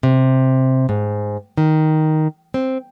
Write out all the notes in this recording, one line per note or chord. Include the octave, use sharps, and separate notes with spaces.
C3
G#2
D#3
C4